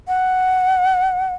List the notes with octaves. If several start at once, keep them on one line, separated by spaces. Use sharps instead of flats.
F#5